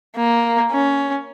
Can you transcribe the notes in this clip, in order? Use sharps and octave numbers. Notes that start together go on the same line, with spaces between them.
A#3
C#4